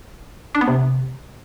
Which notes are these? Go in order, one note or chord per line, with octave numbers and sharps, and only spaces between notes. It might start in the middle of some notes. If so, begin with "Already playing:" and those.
D4
B3
C3